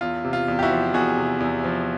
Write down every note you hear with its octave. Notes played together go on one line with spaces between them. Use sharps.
E2 F4
C3
F4
E2
G4
E4 F#4
F3
E2 F#4 G#4
C3
E2
F3